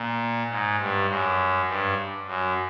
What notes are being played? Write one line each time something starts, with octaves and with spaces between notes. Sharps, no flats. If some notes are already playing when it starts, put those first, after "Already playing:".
Already playing: A#2
G#2
G2
F#2
G2
F#2